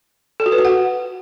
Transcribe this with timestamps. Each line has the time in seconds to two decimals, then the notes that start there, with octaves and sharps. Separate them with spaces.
0.40 A4
0.46 F#4
0.52 B4
0.58 F#4
0.65 F#5